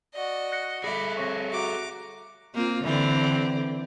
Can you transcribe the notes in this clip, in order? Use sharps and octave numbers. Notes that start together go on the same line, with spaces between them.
F#4 D5 D#5
F#6 A#6 C#7
G#4 A4 D5 E5 B5 A#6
C4 C#5 C#6 A#6
F#4 A#5 D6
A#3 C4 F4
D3 E3 C4